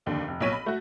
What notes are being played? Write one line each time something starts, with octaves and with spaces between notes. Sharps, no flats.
F1 D#2 D3 D4
F1
B1 A#2 C#5 B6 D#7
B5
A3 F#4